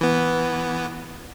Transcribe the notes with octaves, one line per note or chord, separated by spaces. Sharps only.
E3 B3